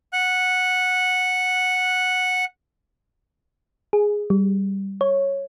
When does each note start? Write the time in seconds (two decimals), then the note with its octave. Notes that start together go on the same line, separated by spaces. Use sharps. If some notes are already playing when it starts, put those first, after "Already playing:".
0.13 F#5 F#6
3.93 G#4
4.30 G3
5.01 C#5